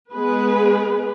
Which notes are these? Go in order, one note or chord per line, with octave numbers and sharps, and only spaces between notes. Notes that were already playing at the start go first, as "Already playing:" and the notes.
G#3 B3 G#4 B4